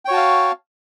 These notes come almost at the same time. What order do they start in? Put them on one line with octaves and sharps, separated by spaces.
G5 C#5 F#4 A5 F5